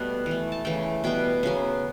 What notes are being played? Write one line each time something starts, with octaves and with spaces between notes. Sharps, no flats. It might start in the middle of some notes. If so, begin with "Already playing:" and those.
Already playing: B2 G3 A3 B3 A4 B4
E3
A3
A5
C#3 E3 A3 G5
B2 G3 B3 G5
C#3 F#3 B3